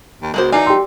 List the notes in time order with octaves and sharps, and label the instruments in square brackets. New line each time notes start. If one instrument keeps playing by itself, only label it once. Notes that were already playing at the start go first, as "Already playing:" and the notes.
[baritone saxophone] D#2
[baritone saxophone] C#2 [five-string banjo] G#3 A#3 C5 [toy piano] F#4 A#4 F#5
[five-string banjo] E3 F5 [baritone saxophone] D#4 [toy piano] D5 D6 [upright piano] G#5
[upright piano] G4 C6 [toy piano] E6